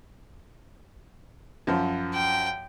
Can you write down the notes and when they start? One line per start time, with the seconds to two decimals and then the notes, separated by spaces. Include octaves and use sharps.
1.67 F#2 F3
2.14 G5